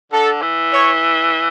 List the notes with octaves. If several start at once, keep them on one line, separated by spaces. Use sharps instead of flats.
D3 A4
E3
C#5